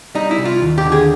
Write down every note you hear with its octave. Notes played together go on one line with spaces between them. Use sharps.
G3 D#4
E4
C2
F4
D#2
G4
D3
G#4